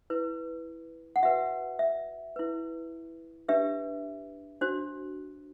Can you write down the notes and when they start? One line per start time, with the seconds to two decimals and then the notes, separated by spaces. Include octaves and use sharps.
0.10 E4 B4
1.16 F#5
1.23 F#4 B4 E5
1.79 E5
2.36 E4 B4
3.48 D4 G4 B4 E5
4.61 D4 F#4 C5